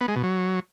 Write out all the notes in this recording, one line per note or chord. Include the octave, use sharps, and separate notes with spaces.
B3
G#3
B2
F#3